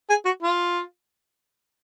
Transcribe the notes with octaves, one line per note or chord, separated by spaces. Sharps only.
G#4
F#4
F4